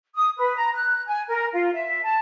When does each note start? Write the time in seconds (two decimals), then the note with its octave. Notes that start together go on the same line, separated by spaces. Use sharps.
0.15 D#6
0.37 B4
0.56 A#5
0.74 F#6
1.06 G#5
1.28 A#4
1.53 F4
1.73 E5
2.03 A5